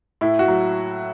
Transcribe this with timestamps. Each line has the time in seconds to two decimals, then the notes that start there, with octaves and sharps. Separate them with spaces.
0.21 A2 E4
0.39 F#4
0.48 F#3